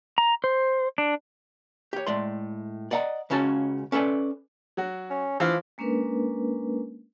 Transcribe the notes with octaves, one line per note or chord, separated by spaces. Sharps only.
A#5
C5
D4
G4 C#5
A2 G#3 D5 C6
D5 D#5 F#5 G#5 A#5
C#2 C#3 C#4 F#4 B4 A5
C#4 A4 B4 D5 G#5
F#3 F#4
C#4
E3 F3 F5
G#3 A#3 C#4 D4 A#4 B4